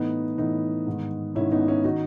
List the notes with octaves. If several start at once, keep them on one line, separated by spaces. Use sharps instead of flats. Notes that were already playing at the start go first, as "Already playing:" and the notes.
Already playing: A2 E3 B3 D#4
A2 E3 B3 D#4
G#2 D#3
G#2 D#3 C#4 E4
B3 D#4
C#4 E4
D#3 D#4 F#4